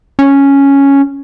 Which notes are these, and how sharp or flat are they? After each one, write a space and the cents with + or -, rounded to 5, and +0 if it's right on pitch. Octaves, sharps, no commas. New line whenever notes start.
C#4 +0